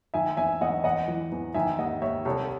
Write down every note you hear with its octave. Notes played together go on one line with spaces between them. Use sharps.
D#3 E5 G#5
E2 E5 G#5
E2 D#5 F#5
E2 D#5 F#5
E3
E2
D#3 E5 G#5
D#2 D#5 F#5
D#2 C#5 E5
C2 A4 C#5